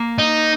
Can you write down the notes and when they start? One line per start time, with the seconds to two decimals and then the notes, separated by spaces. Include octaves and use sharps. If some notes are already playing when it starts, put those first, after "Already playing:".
Already playing: A#3
0.19 D#4